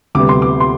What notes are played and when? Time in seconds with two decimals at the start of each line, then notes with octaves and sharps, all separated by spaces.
0.15 D2 C3 G3 B3 D6
0.29 C6
0.42 D6
0.60 C6